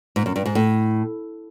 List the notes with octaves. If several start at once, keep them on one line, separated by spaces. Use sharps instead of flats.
G#2
F#2
G2
G#2
A2